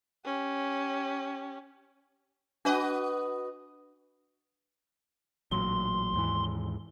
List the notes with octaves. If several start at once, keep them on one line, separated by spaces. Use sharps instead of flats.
C#4 G4
D4 F#4 B4 D#5
A1 A#2 F#3 C6
D#2 G#2 E3